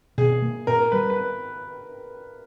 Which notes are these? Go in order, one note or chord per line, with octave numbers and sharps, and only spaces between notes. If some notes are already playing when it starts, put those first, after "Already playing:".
B2 G#4
A#3
A#2 A#4
G3 B4
B4